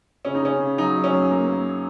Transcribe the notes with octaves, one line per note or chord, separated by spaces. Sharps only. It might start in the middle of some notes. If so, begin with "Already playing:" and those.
C#3 C#4
D#4
C#3 C#4
C#3
F#3 D#4
F#3
C#4
F#2
A#3
A#3